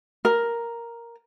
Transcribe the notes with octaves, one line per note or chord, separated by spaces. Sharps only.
A#4